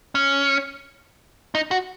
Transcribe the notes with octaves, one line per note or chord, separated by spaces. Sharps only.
C#4
D#4
F#4